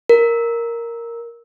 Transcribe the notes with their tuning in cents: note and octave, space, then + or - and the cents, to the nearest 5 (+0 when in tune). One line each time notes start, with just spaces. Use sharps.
A#4 +0